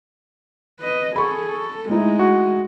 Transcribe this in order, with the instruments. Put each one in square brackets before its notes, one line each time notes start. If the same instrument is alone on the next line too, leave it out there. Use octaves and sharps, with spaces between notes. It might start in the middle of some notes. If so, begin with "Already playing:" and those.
[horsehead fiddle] B4 D#5
[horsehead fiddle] G#4 A4 [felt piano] B5 C#6
[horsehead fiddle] A4
[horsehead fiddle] G#3 [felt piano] A3 D#4 E4
[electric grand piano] F#4